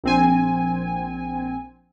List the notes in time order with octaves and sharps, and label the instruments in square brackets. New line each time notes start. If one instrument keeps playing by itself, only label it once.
[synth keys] A#1 C4 G#5